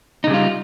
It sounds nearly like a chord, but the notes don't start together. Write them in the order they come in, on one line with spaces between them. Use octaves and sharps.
D#4 C#3 G3 F4